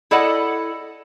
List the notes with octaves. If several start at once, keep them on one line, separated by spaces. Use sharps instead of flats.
E4 A4 D5 D#5 F#5